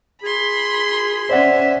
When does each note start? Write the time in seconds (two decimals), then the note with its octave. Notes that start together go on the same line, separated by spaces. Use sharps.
0.23 G#4 B5 C6
1.30 C#4 C5 D5 E5 F#5